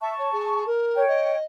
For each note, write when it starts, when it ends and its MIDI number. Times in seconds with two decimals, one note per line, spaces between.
0.01 0.16 76
0.01 0.66 81
0.01 0.66 85
0.17 0.29 73
0.32 0.64 68
0.66 1.05 70
0.96 1.36 73
0.96 1.36 79
1.07 1.43 75